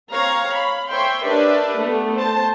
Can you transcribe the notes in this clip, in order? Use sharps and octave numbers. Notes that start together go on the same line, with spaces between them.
C4 C#5 F5 A#5
B5
C5 C#5 E5 G5 C6
D4 G4 A#4 B4 D5 E5
A3 B3
C5 A5